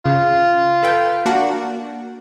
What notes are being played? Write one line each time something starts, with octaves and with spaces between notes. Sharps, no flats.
C#3 F4
A4 B4 G5
A#3 D4 F#4